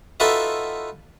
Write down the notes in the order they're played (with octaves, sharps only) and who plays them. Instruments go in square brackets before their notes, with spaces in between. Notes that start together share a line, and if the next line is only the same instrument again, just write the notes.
[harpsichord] D#4 F4 F#4 A4 B4 E5